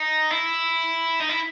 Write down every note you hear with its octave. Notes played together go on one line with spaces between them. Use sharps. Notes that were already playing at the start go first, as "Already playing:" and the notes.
Already playing: D#4
E4
D#4
E4